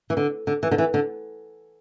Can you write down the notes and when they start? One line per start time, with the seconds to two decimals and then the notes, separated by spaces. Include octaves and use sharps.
0.10 E3
0.17 D3
0.47 D3
0.63 E3
0.71 D3
0.78 E3
0.94 D3